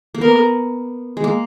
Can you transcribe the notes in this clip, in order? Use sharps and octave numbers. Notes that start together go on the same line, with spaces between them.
A#3
B3 A#4
G#3
A#3